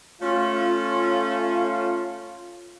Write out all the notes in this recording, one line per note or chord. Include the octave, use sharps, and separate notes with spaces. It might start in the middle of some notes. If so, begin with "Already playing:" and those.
A3 C#4 F4